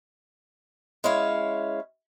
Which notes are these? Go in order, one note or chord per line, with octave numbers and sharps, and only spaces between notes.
G#3 C#4 E4 C#5 F5